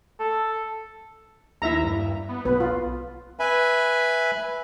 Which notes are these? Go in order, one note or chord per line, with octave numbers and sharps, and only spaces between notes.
A4
D#2 E4 E5 A#5
G2
B3
B1 B3 B4
F4
B4 E5 G#5 B5